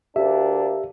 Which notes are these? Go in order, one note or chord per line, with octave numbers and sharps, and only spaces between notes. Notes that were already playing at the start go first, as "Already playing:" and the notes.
D2 A#3 D4 G4 E5